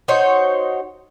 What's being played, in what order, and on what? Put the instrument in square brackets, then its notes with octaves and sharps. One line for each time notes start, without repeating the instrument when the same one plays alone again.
[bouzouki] D#4 F#4 C5 C#5